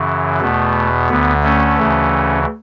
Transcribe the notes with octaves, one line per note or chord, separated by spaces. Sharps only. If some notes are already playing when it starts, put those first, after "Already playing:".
Already playing: F#2 C#3 E3
E2 B2 A3
D2 D3 B3
A3 C#4
D2 C#3 E3